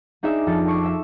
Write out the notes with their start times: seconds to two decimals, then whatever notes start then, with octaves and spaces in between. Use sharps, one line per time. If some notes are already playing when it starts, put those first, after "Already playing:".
0.23 D4 D#4 G#4 D5 E5
0.46 F2 A4 A6
0.67 C#6 D6 C7 C#7
0.81 E5 E6 C#7